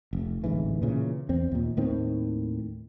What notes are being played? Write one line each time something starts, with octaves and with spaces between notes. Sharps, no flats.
F1
D1 A1 G#2 E3
A#2 C#3 E3
E2 C4
D#2 A#2
D#2 A2 D#3 C4